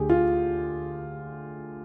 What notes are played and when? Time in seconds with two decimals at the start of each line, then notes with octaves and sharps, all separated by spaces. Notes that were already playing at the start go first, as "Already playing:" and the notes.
Already playing: D2 D3 G4 G#4
0.10 F4